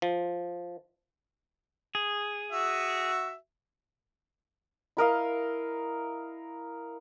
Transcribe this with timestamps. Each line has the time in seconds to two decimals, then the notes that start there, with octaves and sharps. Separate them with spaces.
0.02 F3
1.95 G#4
2.52 F#4 E5
4.97 E4 A#4 D#5 F5